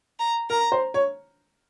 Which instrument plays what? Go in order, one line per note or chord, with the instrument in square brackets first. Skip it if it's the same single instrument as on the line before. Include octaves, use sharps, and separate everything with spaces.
[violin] A#5
[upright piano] A#4 [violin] A#5
[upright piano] C5
C#5